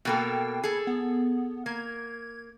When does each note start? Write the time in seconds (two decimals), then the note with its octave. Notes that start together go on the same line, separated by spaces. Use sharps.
0.05 B2 A#3 A4 G5
0.64 G#4 A4 G#6
0.87 B3
1.66 A#3 G#6